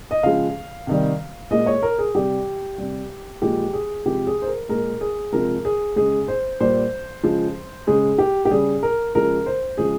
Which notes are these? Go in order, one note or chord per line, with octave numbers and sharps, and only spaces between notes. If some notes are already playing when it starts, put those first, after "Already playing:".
D#5
C#3 F3 G#3 F5
C3 D#3 G3
A#2 G#3 D#5
C#5
A#4
G#4
C3 G3 G4
C3 G3
A#2 F3 G#3 G4
G#4
C3 F3 G#3 G4
G#4
C5
A#4
A#2 G#3 A#4
G#4
C3 F3 G#3 A#4
G#4
C#3 G#3 G#4
C5
A#2 G3 C5
C#3 F3 G#3
C#3 G#3 G#4
G4
G4
C#3 G3 G#4
A#4
C#3 F3 G#3 A#4
C5
C#3 F3 G#3 G#4